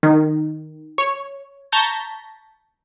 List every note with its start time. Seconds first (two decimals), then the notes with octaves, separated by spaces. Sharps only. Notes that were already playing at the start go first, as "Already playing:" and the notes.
0.03 D#3
0.98 C#5
1.72 A5 A#5 C#6 G6 A#6 B6